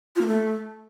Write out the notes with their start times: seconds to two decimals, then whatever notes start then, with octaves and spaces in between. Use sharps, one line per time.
0.16 F4
0.21 A#3
0.26 A3